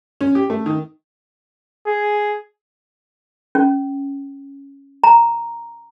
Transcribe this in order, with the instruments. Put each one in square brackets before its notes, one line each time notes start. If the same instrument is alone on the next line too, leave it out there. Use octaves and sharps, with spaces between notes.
[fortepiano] C#4
G4
A3
D#3
[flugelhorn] G#4
[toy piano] C#4
A#5